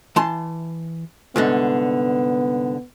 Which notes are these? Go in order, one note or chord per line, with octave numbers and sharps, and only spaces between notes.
E3 A5 C6
C2 G#2 D3 B3